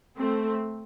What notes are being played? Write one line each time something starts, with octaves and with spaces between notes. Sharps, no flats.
A3 C4